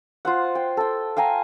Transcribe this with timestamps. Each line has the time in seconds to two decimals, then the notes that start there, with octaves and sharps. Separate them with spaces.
0.25 F4 C5 F#5
0.55 G5
0.77 A4 G5
1.17 F5 G5 G#5 A#5